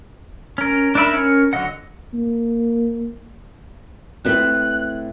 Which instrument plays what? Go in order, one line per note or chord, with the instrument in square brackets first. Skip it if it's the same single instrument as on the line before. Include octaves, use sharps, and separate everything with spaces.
[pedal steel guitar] C#4 A#4
D4 D#4 A#4 E5 B5
C#4 A#4 C#5
D3 F#3 D#5 F#5
[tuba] A#3
[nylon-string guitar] A2 C4 B4 [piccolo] F#6